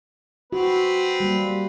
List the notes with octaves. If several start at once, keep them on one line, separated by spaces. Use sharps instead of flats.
C4 F#4 B4
G3 A#3